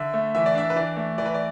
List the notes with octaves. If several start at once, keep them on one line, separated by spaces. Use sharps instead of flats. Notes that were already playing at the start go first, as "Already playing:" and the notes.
Already playing: D3 E5
A3
E3 E5
D5
D4 E5
B4
E3 D5
A3
E3 D5
B4
D5